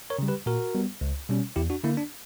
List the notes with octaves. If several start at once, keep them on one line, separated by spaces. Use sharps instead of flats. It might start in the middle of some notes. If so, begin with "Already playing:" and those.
A#4 C#5
C#3 G3
G4 B4
A#2 F#4 A#4
G3 B3
C#2
B2 G3 C#4
E2 E4 G4
D4 F#4
D3 A#3 E4
D4